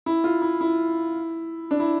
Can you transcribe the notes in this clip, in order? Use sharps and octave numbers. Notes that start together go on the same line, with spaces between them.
E4
F4
E4
E4
D4
E4